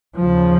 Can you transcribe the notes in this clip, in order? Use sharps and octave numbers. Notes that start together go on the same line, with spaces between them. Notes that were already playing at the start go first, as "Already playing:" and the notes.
D#2 C#3 F3